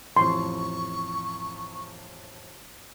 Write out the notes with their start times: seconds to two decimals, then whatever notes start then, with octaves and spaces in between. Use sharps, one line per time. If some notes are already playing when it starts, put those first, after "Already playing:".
0.17 A1 F2 C6 C#6